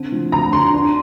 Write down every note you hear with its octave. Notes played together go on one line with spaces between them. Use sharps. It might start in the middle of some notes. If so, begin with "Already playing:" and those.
Already playing: D3 C4
F3
D2 A#5
D3 C6
D4